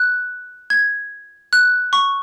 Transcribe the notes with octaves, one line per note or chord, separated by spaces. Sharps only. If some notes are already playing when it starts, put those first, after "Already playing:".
Already playing: F#6
G#6
F#6
C#6